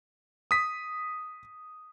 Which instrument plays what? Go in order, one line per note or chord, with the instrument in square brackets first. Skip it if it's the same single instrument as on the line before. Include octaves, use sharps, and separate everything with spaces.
[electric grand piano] D#6 B6